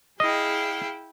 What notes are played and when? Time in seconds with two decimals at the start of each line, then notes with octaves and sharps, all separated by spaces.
0.20 E4 G#4 D#5 F5 G5